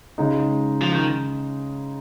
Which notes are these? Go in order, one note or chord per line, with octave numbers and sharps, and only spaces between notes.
C#3 G#3 D#4
F3
D#3